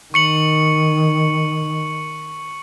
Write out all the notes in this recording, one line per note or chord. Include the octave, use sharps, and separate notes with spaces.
D#3 C#6 C#7 F#7